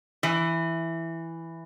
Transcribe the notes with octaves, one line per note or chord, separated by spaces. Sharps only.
E3